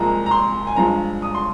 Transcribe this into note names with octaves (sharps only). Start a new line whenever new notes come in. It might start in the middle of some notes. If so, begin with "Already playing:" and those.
Already playing: C2 A#2 F3 G#3 A#5
A#5
C6
G#5
G2 F3 G#3 A#5
D#6
C6